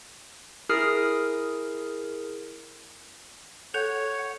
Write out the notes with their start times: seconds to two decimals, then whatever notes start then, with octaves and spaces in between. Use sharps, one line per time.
0.69 E4 G#4 A#4 D#6 F6 C7
3.74 A4 C#5 F#5 F#6 G6 F7